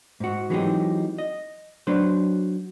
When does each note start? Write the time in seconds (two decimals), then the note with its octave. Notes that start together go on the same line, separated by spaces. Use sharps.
0.20 G#2 F#4
0.50 E3 F#3 G#3 C4 D#4 G4
1.18 D#5
1.87 F#3 D4 B4 C5